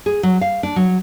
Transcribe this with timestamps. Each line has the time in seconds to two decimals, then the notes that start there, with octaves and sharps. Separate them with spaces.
0.06 G#4
0.23 F#3
0.41 F5
0.63 D4
0.76 F#3